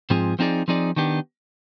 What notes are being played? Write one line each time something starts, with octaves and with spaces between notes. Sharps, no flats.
G#2 F3 C4 F4 G#4
F3 C4 D#4 G#4 D5
F3 C4 D#4 G#4 D5
D#3 B3 D4 G4